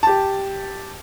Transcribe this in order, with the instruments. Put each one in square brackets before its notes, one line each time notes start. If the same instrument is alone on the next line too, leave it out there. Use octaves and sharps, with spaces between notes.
[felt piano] G4 A5